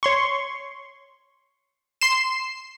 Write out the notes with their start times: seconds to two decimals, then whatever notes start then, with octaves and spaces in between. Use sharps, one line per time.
0.03 C#5 C6 C#6
2.01 C6 C7 E7